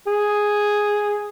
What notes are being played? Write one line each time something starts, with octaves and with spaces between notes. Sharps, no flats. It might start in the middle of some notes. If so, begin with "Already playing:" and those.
G#4